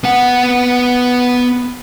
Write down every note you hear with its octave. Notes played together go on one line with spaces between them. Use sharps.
B3 F#5